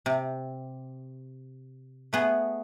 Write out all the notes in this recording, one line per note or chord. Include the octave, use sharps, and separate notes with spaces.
C3
A3 B3 G#4